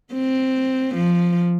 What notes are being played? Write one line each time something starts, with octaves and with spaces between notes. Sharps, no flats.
C4
F3